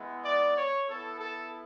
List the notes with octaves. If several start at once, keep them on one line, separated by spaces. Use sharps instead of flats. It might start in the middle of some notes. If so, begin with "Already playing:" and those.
Already playing: G#3 B3 E4
D5
C#5
B3 E4 A4
A4